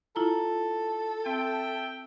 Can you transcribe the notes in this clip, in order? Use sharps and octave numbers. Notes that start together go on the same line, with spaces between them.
E4 F4 A4 A#5
C4 E5 G5